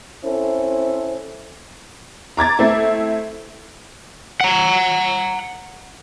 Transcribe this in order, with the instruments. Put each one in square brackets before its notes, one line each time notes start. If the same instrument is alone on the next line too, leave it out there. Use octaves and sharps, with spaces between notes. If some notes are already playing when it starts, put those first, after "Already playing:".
[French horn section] C4 C#4 E4 A4 C5
[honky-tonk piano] A#5 D6 G#6 A6
A3 C4 E4
[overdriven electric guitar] F#5 A#5